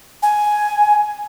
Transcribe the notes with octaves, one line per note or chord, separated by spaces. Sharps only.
G#5